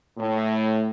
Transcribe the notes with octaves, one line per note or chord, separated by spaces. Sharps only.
A2